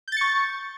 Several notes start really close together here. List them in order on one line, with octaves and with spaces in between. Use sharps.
G6 A6 C#7 C#6